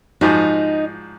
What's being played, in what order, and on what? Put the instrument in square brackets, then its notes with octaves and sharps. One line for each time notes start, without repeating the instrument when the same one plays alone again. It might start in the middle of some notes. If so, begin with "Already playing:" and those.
[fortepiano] G#2 F3 F#4 [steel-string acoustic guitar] D#4